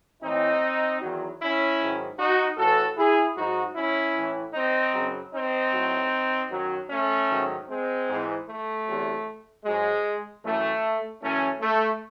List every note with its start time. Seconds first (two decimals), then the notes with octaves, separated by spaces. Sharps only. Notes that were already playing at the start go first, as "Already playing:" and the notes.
0.22 A2 E3 C4 D#4
1.01 E2 D#3 F#3
1.40 C#4 E4
1.80 G#2 D#3 F#3
2.19 D#4 F#4
2.57 A2 E3 F#4 A4
2.97 E4 G#4
3.36 G#2 F#3 D#4 F#4
3.76 C#4 E4
4.15 A2 E3
4.54 C4 D#4
4.94 F#2 C#3 F#3
5.33 C4 D#4
5.72 A2 F#3
6.50 F#2 D#3 F#3
6.90 A3 C#4
7.29 G#2 D#3 F#3
7.69 G#3 C4
8.08 G#2 E3
8.48 A3
8.86 E2 C3 F#3
9.64 G#2 F#3 G#3
10.43 F#2 E3 A3
11.21 F#2 E3 A3 C#4
11.61 A3